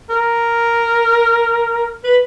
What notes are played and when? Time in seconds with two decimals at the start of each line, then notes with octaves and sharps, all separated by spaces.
0.10 A#4
2.04 B4